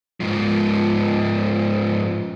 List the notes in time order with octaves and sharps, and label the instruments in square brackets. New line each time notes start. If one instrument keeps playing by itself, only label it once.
[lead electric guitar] G#2 F3